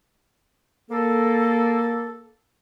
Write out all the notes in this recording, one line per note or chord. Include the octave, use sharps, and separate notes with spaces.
A#3 A4